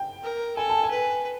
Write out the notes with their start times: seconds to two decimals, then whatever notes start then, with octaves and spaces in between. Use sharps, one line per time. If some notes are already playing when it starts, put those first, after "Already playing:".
Already playing: G5
0.23 A#4
0.56 A4 G#5
0.70 A5
0.84 G#5
0.90 B4